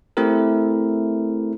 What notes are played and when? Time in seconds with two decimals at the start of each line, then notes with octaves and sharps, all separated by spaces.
0.17 A3 C4 E4 G4 A#4